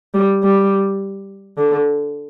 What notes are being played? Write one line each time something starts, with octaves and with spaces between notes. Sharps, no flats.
G3
G3
D3